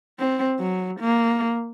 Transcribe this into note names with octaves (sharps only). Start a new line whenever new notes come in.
C4
F#3
A#3